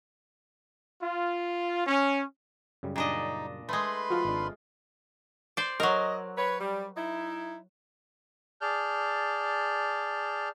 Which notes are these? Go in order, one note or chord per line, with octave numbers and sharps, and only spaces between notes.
F4
C#4
F#2 C#3 G3
A#2 D4 D#4 D#5
G#3 A3 B4 B5 C6
F3 F4 F#4
G#1 D4
C5 D5
F#3 A#4 D#5
B4 C#5
G3
D#4 E4
G#4 D5 A5 F6 G6